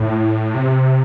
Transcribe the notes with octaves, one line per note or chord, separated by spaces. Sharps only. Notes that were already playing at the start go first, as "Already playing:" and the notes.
Already playing: A2
C3